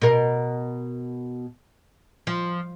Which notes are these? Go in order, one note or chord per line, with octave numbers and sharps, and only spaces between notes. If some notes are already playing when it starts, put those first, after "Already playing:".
B2 A#4
F3